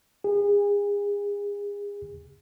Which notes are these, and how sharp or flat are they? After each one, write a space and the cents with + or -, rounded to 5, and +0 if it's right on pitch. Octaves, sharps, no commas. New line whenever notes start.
G#4 -35